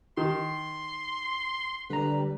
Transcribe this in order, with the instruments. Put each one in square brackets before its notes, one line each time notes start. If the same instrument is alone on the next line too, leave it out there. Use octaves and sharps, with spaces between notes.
[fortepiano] D#3 [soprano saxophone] C6
[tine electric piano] D3 A#5 [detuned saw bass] G3 [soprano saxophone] B4